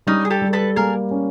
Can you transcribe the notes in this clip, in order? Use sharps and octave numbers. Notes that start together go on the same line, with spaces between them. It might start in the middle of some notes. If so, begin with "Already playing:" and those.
G3 C#4 D#4
G#4
G4 A4
G3
A4 B4
A#3 G#4 A#4
C#4